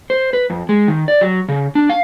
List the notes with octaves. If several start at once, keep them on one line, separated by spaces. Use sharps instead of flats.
C5
B4
F2
G#3
D#3
D5
F#3
C#3
D4
F5